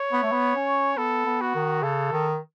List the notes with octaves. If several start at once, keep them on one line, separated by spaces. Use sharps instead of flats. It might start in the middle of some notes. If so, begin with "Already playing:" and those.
Already playing: C#5
B3
A3
B3
C#4
B3 A4
B3
F#4
D#3
C#3 A4
D#3